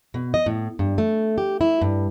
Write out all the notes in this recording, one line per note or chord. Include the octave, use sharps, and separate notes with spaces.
B2
D#5
A2
G2
A3
G4
E4
G2